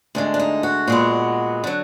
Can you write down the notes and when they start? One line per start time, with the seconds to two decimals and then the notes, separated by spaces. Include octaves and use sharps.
0.15 D2 D3 G#3
0.34 D4
0.39 D#4
0.63 F#4
0.88 A#2 G#3 B3
1.64 D3 F#3